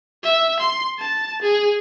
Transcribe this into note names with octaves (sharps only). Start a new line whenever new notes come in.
E5
C6
A5
G#4